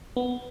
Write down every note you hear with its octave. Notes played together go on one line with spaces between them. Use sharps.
B3